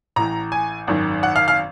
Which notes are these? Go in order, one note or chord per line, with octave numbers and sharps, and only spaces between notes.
A1 A2 E3 A#5
G#5
G#1 F#2 D#3
F#5
F5
F5